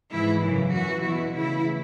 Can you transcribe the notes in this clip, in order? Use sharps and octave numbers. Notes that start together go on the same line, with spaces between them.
G#2 E3 E4
F#2 C#3 E3
F#2 E3 F#4
E2 B2 E4
D2 C#3 E3 E4